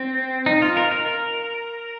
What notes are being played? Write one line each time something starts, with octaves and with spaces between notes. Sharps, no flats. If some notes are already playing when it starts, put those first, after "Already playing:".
Already playing: C4
D#4
F4
A#4
A#4